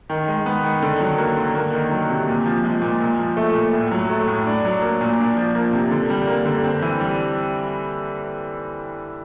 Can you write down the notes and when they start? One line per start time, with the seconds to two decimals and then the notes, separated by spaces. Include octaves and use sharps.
0.10 D#3
0.28 G#3
0.46 B3
0.64 D#3
0.82 D3
1.00 F#3
1.18 A#3
1.37 D3
1.55 A#3
1.73 D#3
1.91 F#3
2.09 C3
2.28 A#2
2.46 F3
2.64 G#3
2.82 A#2
3.00 A#2
3.19 F3
3.37 A3
3.55 A#2
3.73 A2
3.92 F#3
4.10 A3
4.28 A2
4.46 D4
4.65 F#3
4.82 A#3
5.01 A#2
5.18 D4
5.37 F3
5.55 A#3
5.73 C3
5.91 D3
6.10 G3
6.27 A#3
6.46 D3
6.64 C4
6.82 E3
7.00 G3